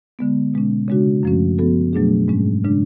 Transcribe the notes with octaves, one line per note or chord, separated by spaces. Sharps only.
D3 G#3 B3
B2 G#3 C#4
C#3 G#3 D4 F#4
F#2 F3 A3 C#4 F#4
F3 B3 F#4 A4
B2 F#3 A3 D4 G#4
G#2 G#3 C#4
C#3 G#3 D4